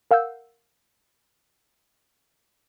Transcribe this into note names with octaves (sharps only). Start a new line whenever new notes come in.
A#4 F5 F#5 E6 G6